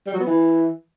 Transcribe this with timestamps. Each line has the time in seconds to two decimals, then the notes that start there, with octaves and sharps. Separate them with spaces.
0.06 G3
0.13 F#3
0.20 B3
0.27 E3